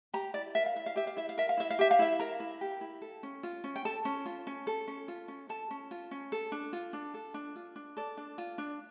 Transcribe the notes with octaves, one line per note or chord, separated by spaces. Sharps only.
G4 A#5
E4 D5
A#4 E5
F5
E4 E5
F5
G4 E5
F5
E4 E5
F5
A#4 E5
F5
E4 E5
F5
G4 E5
F5
E4 E5
A#4 A#5
E4
G4
E4
A4
C#4
F4
C#4
G5
A4 A5
C#4
F4
C#4
A4
C#4
F4
C#4
A4 A5
C#4
F4
C#4
A4
D4
F4
D4
A4
D4
F4
D4
A4 D5
D4
F4
D4